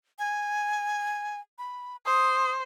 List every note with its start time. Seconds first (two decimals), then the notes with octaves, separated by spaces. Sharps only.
0.19 G#5
1.59 B5
2.06 C5 D#6